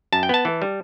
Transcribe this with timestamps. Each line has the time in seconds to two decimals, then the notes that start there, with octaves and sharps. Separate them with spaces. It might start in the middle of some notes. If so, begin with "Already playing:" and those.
0.12 F#2 A5
0.23 G5
0.29 B3 A5
0.45 E3
0.62 G3